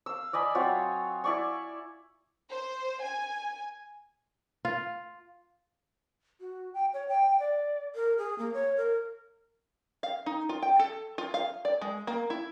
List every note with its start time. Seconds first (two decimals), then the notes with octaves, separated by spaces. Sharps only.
0.06 F5 E6
0.33 D5 D#5 G#5 B5
0.55 F#3 C4 F4 C#5
1.24 E4 D5 C#6
2.50 C5
3.01 G#5
4.65 F4
6.40 F#4
6.74 G5
6.93 C#5
7.09 G5
7.40 D5
7.95 A#4
8.18 G#4
8.38 A#3
8.54 C#5
8.77 A#4
10.03 F5
10.26 D#4
10.49 F4
10.62 G5
10.79 A4
11.18 F4
11.34 F5
11.65 D5
11.81 G#3
12.07 A#3
12.30 E4